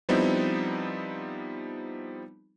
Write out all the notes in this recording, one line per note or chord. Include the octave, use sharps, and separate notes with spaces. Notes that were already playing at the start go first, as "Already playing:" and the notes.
F3 G3 B3 C4 D#4 E4